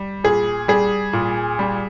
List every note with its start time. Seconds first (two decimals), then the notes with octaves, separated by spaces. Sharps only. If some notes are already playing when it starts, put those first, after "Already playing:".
Already playing: G3
0.24 A#2 G#4
0.68 G3 G#4
1.13 A#2
1.59 G3